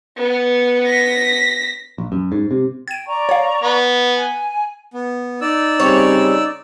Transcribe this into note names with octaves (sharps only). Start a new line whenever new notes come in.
B3
A#6 B6
A#1
F#2
G#2
C3
G5 G#6 D#7
D5 A#5 C#6
C#5 F5
B3
G#5
B3
D#4 D5 E6
C#3 G3 C4 C#5